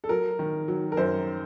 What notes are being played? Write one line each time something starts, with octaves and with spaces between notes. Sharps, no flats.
A4
F#3 A#4
D#3
F#3
A#4
F#2 C5